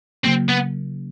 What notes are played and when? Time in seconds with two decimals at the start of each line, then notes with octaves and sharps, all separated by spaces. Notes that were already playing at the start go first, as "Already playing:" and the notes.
0.24 C#3 F#3 A#3 C4
0.49 B3